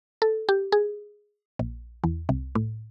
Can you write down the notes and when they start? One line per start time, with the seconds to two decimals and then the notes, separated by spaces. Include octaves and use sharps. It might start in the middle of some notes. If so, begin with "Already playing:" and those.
0.22 A4
0.49 G4
0.72 G#4
1.59 A#1
2.04 E2
2.29 C2
2.55 A2